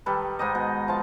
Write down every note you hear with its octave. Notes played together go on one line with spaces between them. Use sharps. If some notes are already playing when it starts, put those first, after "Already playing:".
D#3 G3 A4 B4
G#2 D#4 D#5
B2
F3 A5